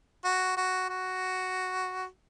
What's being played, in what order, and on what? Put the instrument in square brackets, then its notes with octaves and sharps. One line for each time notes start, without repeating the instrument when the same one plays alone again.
[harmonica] F#4
F#4
F#4